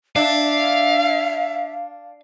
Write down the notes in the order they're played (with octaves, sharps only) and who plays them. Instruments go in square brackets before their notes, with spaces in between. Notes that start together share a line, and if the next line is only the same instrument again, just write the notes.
[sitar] D4 [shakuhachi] E5 [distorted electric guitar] F5